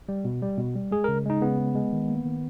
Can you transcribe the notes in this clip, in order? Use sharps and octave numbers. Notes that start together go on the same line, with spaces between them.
G3
B2
G3
B2
G3
G#3 G#4
C#3 A#4
G#3 D#4
C#3 B3
G#3
G#3
D#3
A#3
D#3